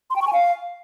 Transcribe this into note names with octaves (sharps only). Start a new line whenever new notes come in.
C6
G5
C#6
G#5
F5